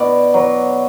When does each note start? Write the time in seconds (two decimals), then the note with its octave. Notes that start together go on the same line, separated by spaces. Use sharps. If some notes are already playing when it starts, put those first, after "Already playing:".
Already playing: B2 D5
0.34 F#3